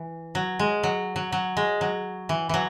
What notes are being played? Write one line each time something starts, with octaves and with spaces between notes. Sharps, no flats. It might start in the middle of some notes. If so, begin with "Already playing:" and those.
Already playing: E3
F#3
G#3
F#3
F#3
F#3
G#3
F#3
E3
E3 F#3